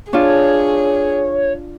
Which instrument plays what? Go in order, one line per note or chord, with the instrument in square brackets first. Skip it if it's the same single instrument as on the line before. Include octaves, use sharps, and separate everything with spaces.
[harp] D4 F4 [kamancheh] G#4 [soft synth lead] C#5